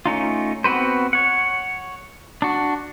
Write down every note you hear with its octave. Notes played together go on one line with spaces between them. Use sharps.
A3 C#4 D#4 F4
B3 C4 F#4 B4 C5
C#5 F#5
D4 F#4